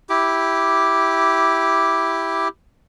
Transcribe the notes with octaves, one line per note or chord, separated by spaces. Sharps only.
E4 G4 D6